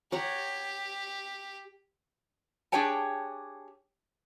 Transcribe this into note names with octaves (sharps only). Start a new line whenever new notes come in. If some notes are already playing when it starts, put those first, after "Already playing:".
G4 C#5 F#5 A#5
D4 G4 G#4 C#5 G5 A5